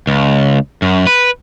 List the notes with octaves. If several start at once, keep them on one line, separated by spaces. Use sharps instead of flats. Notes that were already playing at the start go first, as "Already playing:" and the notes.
C#2
F#2
B4